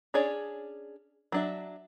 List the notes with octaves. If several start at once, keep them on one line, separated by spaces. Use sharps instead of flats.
C#4 D4 G#4 C#5 D5
F#3 D4 E5